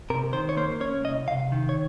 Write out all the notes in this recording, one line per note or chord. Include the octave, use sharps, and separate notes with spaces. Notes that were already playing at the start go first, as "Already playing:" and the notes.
C3 A#4
D#3 C5
C#5
A#3 C5
C#4 C#5
C2 D#5
C3 F5
D#3
C#5